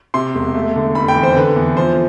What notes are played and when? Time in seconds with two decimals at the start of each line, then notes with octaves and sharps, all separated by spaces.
0.14 C3 C6
0.35 E1
0.55 A3
0.76 D3
0.95 F1 B5
1.08 G5
1.15 E2
1.23 C5
1.36 D3 B4
1.56 E2
1.77 F3 C5